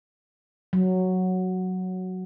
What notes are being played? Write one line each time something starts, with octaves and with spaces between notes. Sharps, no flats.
F#3